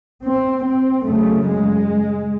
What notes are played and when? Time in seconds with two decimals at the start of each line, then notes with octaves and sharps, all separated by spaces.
0.22 C4
0.64 C4
1.05 F#2 C#3 A3
1.47 G#3